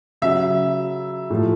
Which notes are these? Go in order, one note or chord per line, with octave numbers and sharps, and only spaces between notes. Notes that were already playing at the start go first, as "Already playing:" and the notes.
C#3 F#3 E5
A2 F3